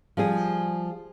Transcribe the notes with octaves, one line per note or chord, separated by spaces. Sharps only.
F3 G3 G#4